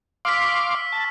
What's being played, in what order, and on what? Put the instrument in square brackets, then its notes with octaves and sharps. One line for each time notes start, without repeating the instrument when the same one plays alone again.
[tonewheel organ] F5 C6 D6 [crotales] E6 F6 B6
[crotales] C#6
[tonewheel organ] A5